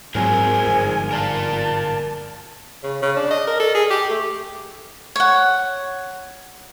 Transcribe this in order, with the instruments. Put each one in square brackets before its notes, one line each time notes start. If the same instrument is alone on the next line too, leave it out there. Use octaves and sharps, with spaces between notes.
[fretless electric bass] G#2 F#3 C4 [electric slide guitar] G#4 A#4 C5 [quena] G#5
[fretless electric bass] G1 G#2 F3
[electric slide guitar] A#4 D5 F5 [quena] A5
[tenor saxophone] C#3
C#3
D4
D#5
A#4
A4
G#4
G4
A3
[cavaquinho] C#5 F#5